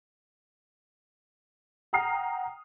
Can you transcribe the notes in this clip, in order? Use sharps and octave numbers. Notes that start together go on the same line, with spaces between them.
F#5 G5 A#5 D#6 F6 C7